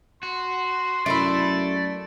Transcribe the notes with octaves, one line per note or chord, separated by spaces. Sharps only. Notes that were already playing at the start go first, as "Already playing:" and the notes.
F#4 C6
F#2 A3 E4 D5